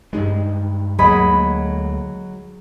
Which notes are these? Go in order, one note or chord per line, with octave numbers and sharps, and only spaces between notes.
G2 G#3 D#4 G4
D2 F#3 G#3 A#3 G#4 D#5 B5